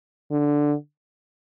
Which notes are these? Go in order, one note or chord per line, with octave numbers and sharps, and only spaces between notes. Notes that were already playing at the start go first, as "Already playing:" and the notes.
D3